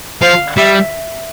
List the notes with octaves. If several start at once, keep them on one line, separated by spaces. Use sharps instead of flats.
F3 F5
G3 E5